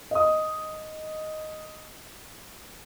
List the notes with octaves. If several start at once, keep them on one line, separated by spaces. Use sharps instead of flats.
D#5 D#6